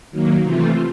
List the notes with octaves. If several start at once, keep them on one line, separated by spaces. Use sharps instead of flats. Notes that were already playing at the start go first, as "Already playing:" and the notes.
D#3 F#3 A#3
C3 E3 A3 C4 F4